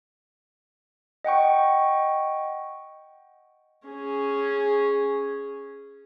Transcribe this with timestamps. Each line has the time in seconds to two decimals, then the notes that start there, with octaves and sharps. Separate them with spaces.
1.24 D#5 F#5 G5 C#6
3.88 C#4 G#4